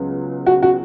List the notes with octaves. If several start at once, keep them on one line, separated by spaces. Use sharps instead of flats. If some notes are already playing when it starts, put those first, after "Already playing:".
Already playing: C#2 C#3 F#3 B3
F#4
F#4